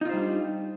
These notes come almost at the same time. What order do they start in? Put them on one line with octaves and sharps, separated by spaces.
D#4 F4 C5 G3 D4